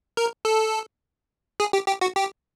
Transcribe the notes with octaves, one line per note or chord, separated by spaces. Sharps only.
A#4
A4
G#4
G4
G4
F#4
G4